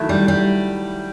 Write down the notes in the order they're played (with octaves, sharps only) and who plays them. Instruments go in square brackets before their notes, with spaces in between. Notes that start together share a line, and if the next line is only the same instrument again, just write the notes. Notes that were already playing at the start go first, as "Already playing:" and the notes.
Already playing: [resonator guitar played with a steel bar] D#3 F#3 A3 E4
[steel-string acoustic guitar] G3
G3